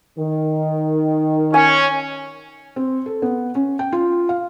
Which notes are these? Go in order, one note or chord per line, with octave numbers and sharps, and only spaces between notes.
D#3
C#4 G#5
C4
A4
B3
C#4
G5
F4
F5